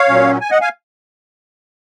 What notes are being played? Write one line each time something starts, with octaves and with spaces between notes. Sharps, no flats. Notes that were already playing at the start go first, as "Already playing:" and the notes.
Already playing: C#5 F5
A#2 F#3 C#4
G#5
D#5 F#5
F5 G#5